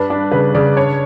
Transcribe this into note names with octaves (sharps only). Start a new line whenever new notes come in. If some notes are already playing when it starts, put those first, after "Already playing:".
Already playing: G2 D4 B4
D4
C#3 B4
C#3 D5
D4 C#5